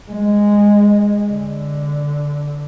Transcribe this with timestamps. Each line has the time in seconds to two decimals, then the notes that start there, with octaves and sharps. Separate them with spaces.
0.12 G#3
1.31 D3